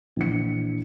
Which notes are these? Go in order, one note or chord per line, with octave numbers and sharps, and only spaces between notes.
A#1 E3 C#7